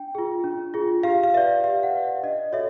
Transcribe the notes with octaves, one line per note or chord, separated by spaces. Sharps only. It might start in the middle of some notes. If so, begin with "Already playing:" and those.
Already playing: D4 G5
F4 G#4
D4
F4 G#4
G4 F5
F5
B4 D5 E5
G4 F5
F#5
B4 D5
E5
D4 D#5
F#4 A4 C#5 E5